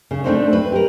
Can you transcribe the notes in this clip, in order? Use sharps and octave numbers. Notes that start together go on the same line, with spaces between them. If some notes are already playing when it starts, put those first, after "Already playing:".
C#3
A3 A#3 C4 D4 D#4 C5
B4
G4 A#4